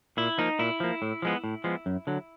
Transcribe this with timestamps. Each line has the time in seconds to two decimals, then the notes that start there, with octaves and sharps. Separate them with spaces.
0.17 A#2 E4
0.38 F3 A#3 D#4
0.59 A#2 E4
0.80 F3 A#3
1.02 A2
1.22 F3 G#3 B3
1.44 A2
1.64 F3 G#3 B3
1.86 F#2
2.07 D3 F#3